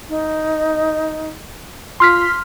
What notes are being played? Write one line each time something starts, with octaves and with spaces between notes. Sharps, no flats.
D#4
F4 C6 F6 B6